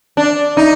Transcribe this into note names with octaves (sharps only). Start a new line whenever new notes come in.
D4
D#4